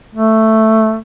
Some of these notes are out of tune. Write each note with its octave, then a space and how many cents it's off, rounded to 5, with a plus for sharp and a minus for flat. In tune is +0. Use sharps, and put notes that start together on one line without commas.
A3 +5